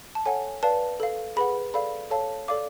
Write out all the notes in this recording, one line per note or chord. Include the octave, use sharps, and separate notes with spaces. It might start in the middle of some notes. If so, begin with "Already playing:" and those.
A5
A4 C#5 F#5 G#5
B4 D5 F5 A5
A4 F5
G#4 B4 F#5 B5
A4 D5 F5 B5
A4 C#5 F5 A5
A4 D5 F5 D6